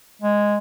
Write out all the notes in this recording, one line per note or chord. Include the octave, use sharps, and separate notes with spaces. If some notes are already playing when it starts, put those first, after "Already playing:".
G#3